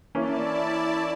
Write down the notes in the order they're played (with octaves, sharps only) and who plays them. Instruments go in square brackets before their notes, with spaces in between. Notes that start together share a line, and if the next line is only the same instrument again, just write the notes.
[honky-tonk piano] E3 A#3 C#4 [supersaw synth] E4 D5 A5